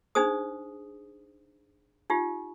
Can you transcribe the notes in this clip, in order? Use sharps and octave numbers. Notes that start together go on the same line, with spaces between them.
D4 D#4 G#4 C5 D#6
D#4 F4 G4